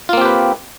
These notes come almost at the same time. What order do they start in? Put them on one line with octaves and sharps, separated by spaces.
F4 A#3 C4 G4 B4